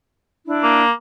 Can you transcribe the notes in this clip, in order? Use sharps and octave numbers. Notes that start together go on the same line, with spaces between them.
D4 E4
A#3